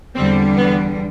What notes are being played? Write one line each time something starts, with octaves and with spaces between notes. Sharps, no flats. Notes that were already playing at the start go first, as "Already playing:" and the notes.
E2 D3 G3 C4
B3